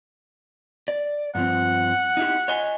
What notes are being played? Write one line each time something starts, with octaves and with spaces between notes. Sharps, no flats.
D5
G2 F3 C4 F#5
D#4 E4 G4
C#5 D#5 G#5